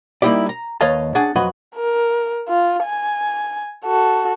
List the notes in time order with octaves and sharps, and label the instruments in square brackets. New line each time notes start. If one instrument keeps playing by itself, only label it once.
[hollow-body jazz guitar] G3 A#3 D#4 E4 G4 D5
A#5
D#2 B4 C#5 D#5 F5 A5
C#4 D4 G#4 F#5 A5
F2 F#3 F#4 B4 D#5
[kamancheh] A#4
F4
G#5
F#4 A4